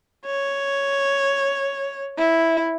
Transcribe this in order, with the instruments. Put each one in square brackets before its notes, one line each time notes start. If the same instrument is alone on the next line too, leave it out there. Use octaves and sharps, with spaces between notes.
[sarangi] C#5
E4